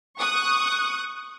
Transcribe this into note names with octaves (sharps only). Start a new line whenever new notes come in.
C#6 D#6 F#6